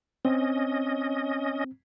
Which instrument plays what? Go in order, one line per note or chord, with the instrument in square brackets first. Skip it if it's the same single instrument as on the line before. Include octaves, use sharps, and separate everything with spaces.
[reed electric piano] C4 [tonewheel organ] C#4 D#5